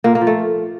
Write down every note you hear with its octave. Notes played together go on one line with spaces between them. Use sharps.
A#2 A#3
A#3
F3
A3